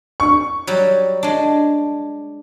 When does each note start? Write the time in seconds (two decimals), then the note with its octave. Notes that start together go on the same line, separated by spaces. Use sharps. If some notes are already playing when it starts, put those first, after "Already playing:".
0.20 C#6
0.67 F#3 G3
1.23 G#3 D4